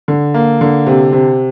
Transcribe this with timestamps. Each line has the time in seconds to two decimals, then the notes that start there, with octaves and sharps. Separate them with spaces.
0.08 D3
0.34 A#3
0.61 D3
0.86 C3
1.12 C3